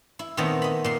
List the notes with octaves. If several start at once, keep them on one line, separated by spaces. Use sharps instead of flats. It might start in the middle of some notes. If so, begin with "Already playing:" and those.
E4
A#2 D#3 A3 B3 C4 A#5
D#5 B5
A#2 C6